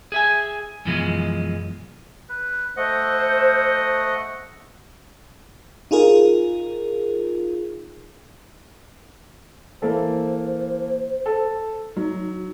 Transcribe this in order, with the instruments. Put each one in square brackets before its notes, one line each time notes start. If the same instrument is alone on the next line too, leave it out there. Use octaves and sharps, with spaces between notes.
[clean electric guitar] G#4 E5 G#5
F#2 B2 E3 F3 G3 G#3
[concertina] B4
[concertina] A3 D#5 F#5 [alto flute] C5
[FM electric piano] D#4 F4 G#4 A#4
[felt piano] E3 A#3 A4 [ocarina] C5
[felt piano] A4
[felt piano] F#3 [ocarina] D#4